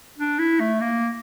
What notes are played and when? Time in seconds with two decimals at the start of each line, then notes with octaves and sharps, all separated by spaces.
0.18 D4
0.39 E4
0.60 A3
0.81 A#3